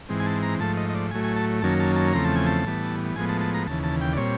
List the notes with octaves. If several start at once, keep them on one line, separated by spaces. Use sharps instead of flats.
G#2 E3 G#3 C4
G#5
A5
A#5
G#2 F3 A3 A5
D#5
D#5
D5
A2 F#3 A3 G#5
G#5
A5
F#2 D#3 F#3 A#3 C#4 A5
A5
A5
E2 C#3 F3 A3 C4 A#5
A5
G#5
A5
A2 E3 G3 B3
A2 F3 G#3 B3 G#5
A5
A5
A#5
D#2 C#3 E3 A5
A5
G5
D5
A#2 G3 C4 C#5